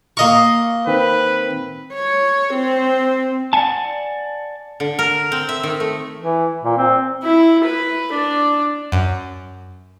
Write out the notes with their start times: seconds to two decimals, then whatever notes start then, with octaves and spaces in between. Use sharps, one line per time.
0.17 A#3 A#4 D#5 C#6
0.87 D#3 C4 B4
1.94 C#5
2.54 C4
3.53 D5 E5 F#5 G#5 A5
4.80 D3
4.99 A#4
5.32 C4
5.49 E5
5.63 D#3
5.80 A3
6.19 E3
6.63 A#2
6.78 C4
7.23 E4
7.64 B4
8.12 D4
8.92 F#2